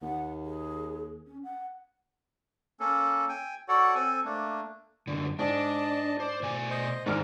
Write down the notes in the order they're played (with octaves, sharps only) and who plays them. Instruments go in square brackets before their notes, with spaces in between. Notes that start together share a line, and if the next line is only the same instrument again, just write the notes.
[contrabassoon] D#2 [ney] F#5
[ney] G#4
C#4
F#5
[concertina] A#3 C#4 A4
G5 G#5
F#4 A4 C#5 D5 F#5
C4 A4 G#5
A3 A#3 D4
[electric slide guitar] F#2 D3
[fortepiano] G#2 [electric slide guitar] D4 [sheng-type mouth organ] D#5 A5
[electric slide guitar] C5 [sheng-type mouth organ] D5
[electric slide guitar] B2 A3 G#5
[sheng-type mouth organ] C5 D#5
[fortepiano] G#2 F6 [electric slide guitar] D#3 D4 D#4 [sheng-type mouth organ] A#4 D6